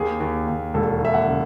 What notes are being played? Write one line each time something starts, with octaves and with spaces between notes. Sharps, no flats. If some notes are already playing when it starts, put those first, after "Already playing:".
Already playing: D#2 G#4
D#2
D#2
E1 A4
D#2 E5
F#5
C#3